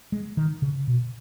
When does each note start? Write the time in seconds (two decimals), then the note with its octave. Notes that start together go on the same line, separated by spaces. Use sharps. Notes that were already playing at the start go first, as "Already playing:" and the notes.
0.12 G#3
0.37 D#3
0.62 C#3
0.87 B2